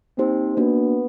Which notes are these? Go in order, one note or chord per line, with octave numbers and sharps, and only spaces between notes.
A#3 C4 D#4 G4 C5
A#3 B3 D4 F#4